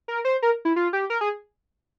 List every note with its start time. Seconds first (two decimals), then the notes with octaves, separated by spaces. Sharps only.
0.08 A#4
0.25 C5
0.42 A#4
0.65 E4
0.76 F4
0.93 G4
1.10 A#4
1.21 G#4